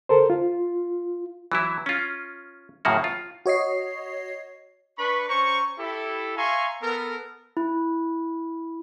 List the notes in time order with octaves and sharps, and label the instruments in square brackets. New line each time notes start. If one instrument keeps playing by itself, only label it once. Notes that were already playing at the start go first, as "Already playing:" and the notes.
[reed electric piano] A4 A#4 C5
F4
[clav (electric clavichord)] E3 F#3 E4
C#4 F4
F#2 A2 C#3 A#3 F#4
F4
[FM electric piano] F#4 C#5 D#5 C7
[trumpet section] D4 B4 B5 C#6
C#4 C5 A#5 C#6
E4 G4 A4
E5 F5 G#5 A#5 C6 C#6
B3 A4 A#4
[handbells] E4